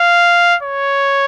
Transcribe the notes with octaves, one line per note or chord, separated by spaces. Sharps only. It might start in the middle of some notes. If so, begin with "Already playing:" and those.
Already playing: F5
C#5